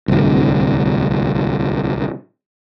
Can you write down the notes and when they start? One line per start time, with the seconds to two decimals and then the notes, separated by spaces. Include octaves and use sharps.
0.08 D1 C2